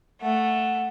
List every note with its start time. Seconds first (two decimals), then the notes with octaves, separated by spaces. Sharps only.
0.21 A3 F#5